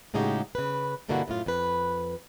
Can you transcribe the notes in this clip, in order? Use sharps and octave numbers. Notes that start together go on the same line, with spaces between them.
A2 C#3 G#3 D#4 F#4 G4
C#3 B4
G2 B2 D3 A#3 E4 F#4
F#2 A2 F4
F2 B4